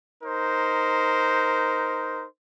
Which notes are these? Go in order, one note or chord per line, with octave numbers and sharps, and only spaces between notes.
D#4 A#4 C5